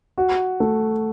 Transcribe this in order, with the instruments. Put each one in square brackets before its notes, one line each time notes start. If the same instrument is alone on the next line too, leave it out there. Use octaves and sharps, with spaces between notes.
[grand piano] F#4
A3